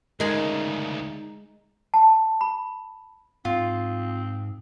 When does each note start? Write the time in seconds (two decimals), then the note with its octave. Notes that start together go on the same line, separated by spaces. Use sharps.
0.20 D2 C#3 G#3 D#4 G#4 A#4
1.94 A5
2.41 B5
3.45 G#2 C4 F4